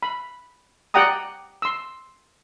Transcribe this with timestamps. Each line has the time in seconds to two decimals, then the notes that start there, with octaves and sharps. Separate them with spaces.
0.02 B5
0.94 G4 D5 F#5 G5 A#5 D#6
1.62 C6 E6